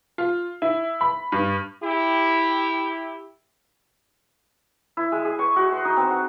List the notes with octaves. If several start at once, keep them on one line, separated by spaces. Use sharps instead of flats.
F4
E4
B5
G2
E4 G4
E4
G#3
G#4
C#6
F#4
C6
D#4
C4
F#5